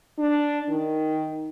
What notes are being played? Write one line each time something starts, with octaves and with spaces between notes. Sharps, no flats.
D4
D#3